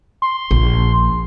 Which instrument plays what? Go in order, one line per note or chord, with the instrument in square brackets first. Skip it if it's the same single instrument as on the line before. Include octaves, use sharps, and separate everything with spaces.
[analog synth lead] C6
[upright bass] A#1